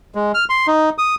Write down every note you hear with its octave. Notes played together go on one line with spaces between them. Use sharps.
G#3
F6
C6
D#4
D#6